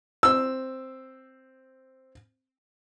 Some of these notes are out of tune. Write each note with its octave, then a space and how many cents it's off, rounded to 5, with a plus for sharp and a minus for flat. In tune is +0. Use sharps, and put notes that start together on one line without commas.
C4 +0 E6 +0